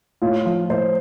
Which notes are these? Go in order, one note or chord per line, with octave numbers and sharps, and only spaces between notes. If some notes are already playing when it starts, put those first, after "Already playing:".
A2 F4
F3
A2 C5